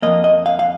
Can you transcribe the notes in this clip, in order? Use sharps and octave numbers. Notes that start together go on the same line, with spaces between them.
F2 D#3 A#3 D#5
D#5
F5
F5